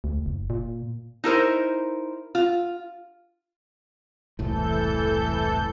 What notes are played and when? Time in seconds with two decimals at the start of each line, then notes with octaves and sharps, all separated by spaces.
0.04 D2
0.26 F#1
0.50 A#2
1.24 D#4 E4 A#4 C5
2.35 F4
4.39 E1 C2 A2 E3 A4 G6